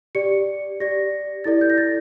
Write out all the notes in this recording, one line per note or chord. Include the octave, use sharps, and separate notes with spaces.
G4 D5 C#7
G4 D5 A#6
E4 A4 D5 A6
G6
A#6
A6